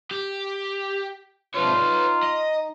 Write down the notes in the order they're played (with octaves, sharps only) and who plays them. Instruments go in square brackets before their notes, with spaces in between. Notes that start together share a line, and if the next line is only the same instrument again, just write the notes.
[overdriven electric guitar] G4
[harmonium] G#2 C3 D4 [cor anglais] F4 [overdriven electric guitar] B4 C#5
[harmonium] D#4
[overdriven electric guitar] D#5